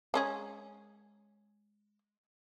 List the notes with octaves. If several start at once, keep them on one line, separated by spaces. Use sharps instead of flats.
G#3 C#4 G#4